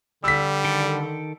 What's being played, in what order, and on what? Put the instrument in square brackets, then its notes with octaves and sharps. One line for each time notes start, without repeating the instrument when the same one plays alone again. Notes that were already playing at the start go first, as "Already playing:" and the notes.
[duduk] D3 [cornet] G3 [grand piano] E6 B6
[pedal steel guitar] D#3 A4 G5